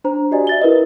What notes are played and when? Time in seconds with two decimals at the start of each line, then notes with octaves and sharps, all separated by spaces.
0.04 D4 C5 A#5
0.31 F#4 G4 D5 D#5 G#5
0.47 E5 A6 G7
0.62 E4 A#4 B4 D5 D#5